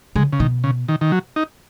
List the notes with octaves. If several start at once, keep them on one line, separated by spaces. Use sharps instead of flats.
C#3 G#3
C#3
B2 D#3
C#3
D#3
D#3
F#3
D#4